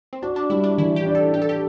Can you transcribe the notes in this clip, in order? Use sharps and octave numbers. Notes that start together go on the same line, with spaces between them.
C4
D4 F#4
D4
G3 E4
D4
E3 E4
G4
D4
A4
D4 G4
A4
G4